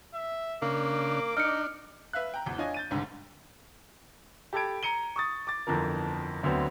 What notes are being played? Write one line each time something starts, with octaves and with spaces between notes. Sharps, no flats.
E5
C#3 A#3 D4 D6
D4 D#4 F6 C#7
B4 E5 F5 F#6
G5 A#5
G#1 E2
D4 F4 C#5 D#5 G#5
G6 A6 D#7
G1 C2 G#2 D3
G4 A4 A5 B5 G#6 D7
A#5 C#7 D#7 G7
C#6 D#6 A6
D6 A6
G1 F2 E3 F3 A#4
D2 F#3 B3 C4